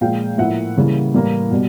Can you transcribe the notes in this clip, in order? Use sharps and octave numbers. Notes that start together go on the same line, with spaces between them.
A#2 F3 G#3 F5 G5
A2 F3 A#3 E5 F#5
C#3 E3 G3 A#3
A2 E3 G3 A#3
B2 G3